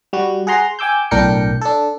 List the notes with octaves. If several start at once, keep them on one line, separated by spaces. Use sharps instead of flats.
G3 F#4
G#4 F#5 A#5 C6
G5 G#5 D6 E6 G6
B1 A2 D4 A#4 G5 C#7
D4 A4